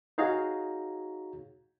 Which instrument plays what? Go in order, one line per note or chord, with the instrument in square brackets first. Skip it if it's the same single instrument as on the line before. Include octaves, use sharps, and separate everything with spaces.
[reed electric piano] D#4 F#4 G#4 C#5 F5 A#5